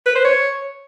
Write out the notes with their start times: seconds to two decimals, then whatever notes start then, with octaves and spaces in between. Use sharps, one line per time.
0.06 B4
0.16 C5
0.25 C#5